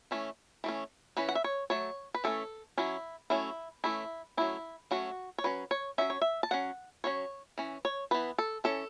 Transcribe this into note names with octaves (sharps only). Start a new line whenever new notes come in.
E3 A3 C#4
E3 A3 C#4
E3 C#4 B4
F#5
E5
C#5
F#3 A3 C#5
B4
E3 A3 C#4 A4
F#3 C#4 E4
F#3 A3 C#4 E4
E3 A3 C#4 E4
F#3 A3 C#4 E4
F#3 A3 C#4 F#4
C#5
F#3 C#4 B4
C#5
F#3 A3 C#4 E5
C#5
E5
A5
F#3 C#4 F#5
F#3 C#4 C#5
E3 C#4
C#5
E3 B3 B4
A4
E3 C#4 A4